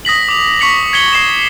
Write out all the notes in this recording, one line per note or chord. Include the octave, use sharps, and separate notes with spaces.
D#6 A#6 B6 F#7
D6 F7
C#6 A#6 B6 C#7 F7 F#7
G#6 B6 C#7 F7 G7
C#6 C7 C#7 E7